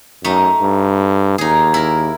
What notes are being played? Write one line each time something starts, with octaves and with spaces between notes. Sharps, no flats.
F#2 A3 D#4
G2
D#2 D#4 G#4
E4 A#4